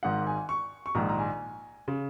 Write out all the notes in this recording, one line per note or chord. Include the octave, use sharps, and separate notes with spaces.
G#1 G#2 D#3 F#5
G#5
C#6
C#6
A#1 G#2 D#3 A#5
A#5
G#5
C#3